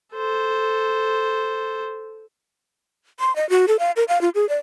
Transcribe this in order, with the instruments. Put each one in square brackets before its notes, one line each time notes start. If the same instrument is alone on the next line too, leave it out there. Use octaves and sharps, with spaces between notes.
[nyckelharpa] A4 C5
[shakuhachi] C6
D#5
F#4
A4
F5
A#4
F5
F4
G#4
D5